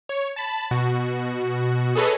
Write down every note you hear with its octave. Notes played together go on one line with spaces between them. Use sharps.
C#5
A5 B5
B2 F#4
G#4 A4 B4 C#5 D#5